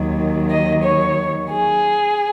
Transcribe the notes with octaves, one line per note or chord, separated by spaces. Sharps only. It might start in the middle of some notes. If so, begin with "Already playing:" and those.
Already playing: D#2 D#3 F#3
D#5
C#5
G#4